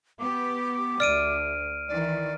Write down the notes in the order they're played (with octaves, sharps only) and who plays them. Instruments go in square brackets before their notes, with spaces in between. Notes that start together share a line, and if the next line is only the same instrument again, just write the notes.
[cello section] B3 G4 [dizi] D6
[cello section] D2 [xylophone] D5 [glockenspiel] F6 D7 D#7
[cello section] D#3 E3 [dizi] D5